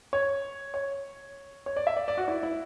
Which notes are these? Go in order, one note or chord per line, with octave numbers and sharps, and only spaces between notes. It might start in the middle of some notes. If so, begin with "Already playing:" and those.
C#5
C#5
C#5
D5
E5
D5
D5
F#4
E4
E4